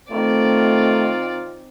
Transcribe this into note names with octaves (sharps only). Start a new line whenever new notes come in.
D#3 A3 C4 F4 D5